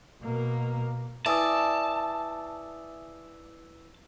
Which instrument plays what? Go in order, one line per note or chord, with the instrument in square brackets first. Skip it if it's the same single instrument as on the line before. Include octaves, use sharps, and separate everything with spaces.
[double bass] B2 A#3
[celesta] E4 B4 E6 [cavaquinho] D5 [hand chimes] E5 G#5 D#6 [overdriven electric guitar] A5